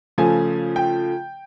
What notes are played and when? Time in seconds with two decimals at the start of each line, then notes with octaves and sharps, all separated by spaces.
0.18 C#3 F3 A3 G#5
0.76 G5